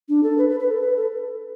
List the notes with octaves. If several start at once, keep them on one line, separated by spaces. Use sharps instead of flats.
D4
A4
B4
B4
B4
A4
B4
A4